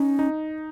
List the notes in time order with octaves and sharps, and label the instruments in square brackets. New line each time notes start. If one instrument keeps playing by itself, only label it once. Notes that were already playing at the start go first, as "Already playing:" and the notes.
Already playing: [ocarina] C#4 [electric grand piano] D#4
[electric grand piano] D#4